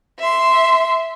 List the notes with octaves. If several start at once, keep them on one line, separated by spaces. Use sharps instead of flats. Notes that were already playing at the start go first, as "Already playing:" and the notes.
E5 C6